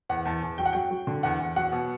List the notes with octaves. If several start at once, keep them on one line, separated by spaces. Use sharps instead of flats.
E2 F#5
E2 A5
E2
F#3 G5
F#5
F#3 G5
F#3
D3
E2 F#5
E2
F#3 F#5
B2